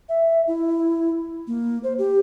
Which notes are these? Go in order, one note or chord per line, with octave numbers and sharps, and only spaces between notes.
E5
E4
A#3
C5
G4